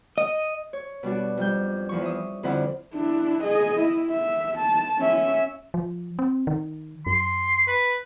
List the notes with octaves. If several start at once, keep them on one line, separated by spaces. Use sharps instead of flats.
D#5
C#5
B2 G3 D4 F#4
F2 G3 G6
E2 F3 C#6
E5 D#6
F2 D3 G3 C4 E4 F#5
D4 E4
G#4 D#5
E4
E5
A5
C#4 E5
F3
C4
D#3
F#2 C6
B4